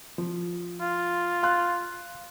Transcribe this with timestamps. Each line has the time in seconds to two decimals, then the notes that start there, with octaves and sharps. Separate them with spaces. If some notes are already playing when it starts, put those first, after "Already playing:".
0.18 F3
0.80 F4
1.43 F5 C6 F#6